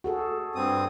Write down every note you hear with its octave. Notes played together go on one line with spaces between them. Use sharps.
F#4 G#4 A4
G2 C4 D#6